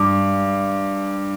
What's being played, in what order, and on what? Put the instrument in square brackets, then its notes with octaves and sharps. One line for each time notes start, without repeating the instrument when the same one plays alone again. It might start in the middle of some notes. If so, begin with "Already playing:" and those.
Already playing: [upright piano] G2 [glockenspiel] D6